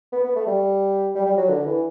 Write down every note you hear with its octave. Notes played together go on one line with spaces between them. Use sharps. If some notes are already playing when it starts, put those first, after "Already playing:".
B3
B3
A3
G3
G3
G3
F#3
D3
E3